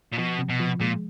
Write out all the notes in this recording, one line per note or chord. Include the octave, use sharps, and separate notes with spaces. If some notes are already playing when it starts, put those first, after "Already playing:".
A#2
B2 F3
C3
B2
F3
A#2 G#3